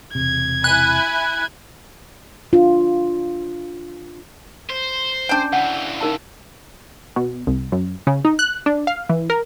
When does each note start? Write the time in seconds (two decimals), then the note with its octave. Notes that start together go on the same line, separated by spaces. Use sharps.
0.15 E1 C3 G#6
0.64 E4 G#5 B5 F#6
2.53 D4 F4
4.70 C5
5.29 C#4 D4 G5 G#5
5.53 C#3 E3 F#5
6.01 D#4 A#4 A5
7.16 B2
7.47 C2
7.72 F#2
8.07 C#3
8.25 D#4
8.39 F#6
8.66 D4
8.87 F5
9.09 E3
9.30 A#4